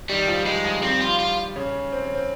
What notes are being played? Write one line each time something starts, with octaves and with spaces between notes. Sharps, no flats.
D#3 G3 D#4
F3 F4
G3 G#3 G4
F3 F4
G3 C4 G4
F4
F4
C#3 C#4
C4
C#4
C4